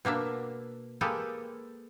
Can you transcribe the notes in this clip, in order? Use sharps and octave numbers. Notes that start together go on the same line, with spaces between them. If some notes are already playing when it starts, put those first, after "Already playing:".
B2 A#3 D4 E5
G#3 A#3 G4 A4 B4